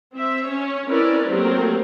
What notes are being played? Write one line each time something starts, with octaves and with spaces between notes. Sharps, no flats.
C4 E5
C#4 C#5
C4 C#4 E4 A#4 B4 D5
F#3 A3 A#3 C4 G4 A#4